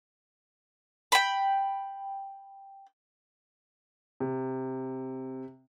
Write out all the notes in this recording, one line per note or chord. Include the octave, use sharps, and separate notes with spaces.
G5 B5
C3